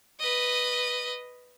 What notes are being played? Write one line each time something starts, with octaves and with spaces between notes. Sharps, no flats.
B4 D#5